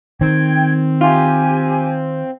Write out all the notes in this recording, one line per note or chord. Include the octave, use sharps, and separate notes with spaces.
D#3 C4 G5 G#6
F4 G4 G#5